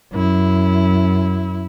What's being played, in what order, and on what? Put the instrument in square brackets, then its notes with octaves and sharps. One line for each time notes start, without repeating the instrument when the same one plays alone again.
[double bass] F#2 E4